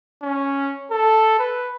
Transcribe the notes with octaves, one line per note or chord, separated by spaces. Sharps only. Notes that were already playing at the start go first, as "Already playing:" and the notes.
C#4
A4
B4